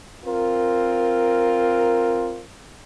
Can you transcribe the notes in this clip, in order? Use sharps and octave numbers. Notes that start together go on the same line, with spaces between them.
C4 F4 A#4